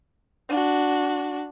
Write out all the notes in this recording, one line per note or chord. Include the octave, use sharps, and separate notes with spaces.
D4 F#4